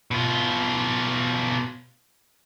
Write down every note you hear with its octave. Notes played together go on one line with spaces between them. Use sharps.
B2 F4